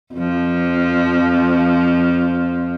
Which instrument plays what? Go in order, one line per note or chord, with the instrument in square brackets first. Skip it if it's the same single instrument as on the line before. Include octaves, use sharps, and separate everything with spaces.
[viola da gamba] F2 F3